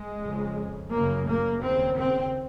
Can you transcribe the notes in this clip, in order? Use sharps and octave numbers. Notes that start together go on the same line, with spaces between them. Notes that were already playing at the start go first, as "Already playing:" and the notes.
Already playing: G#3
F2 C#3
F#2 C#3 A#3
A#3
D#2 C#3 C4
C4